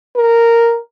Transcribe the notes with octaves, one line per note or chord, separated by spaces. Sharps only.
A#4